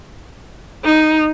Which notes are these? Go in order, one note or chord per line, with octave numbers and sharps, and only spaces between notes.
D#4